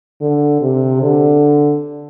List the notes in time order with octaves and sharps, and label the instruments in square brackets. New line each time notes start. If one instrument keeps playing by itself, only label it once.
[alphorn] D3
C3
D3